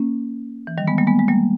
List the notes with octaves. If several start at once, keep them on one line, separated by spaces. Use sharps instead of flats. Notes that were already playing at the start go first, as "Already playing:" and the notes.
Already playing: A#3 C#4
E3
D#3 G3
G#3 B3
G3 A#3
G#3 B3
G#3
G3 A#3